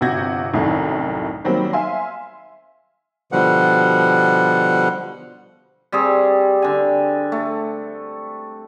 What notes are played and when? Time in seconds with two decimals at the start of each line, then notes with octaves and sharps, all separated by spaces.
0.01 G1 C3 F#4 G6 G#6 A#6
0.54 C2 F#2 A2 D#3
1.44 D#3 F#3 G3 A#3 C4
1.73 E5 F5 G#5 C6
3.32 B2 D3 F3 G3 F#5
5.92 G3 C4 G#4
6.62 D3 G#5
7.32 A3